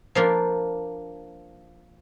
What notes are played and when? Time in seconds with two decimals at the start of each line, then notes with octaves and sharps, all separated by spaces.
0.15 F3 A#3 D4